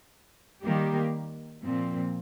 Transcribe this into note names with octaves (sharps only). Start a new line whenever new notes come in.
D#3 G3 A#3 G4
A#2 F3 C4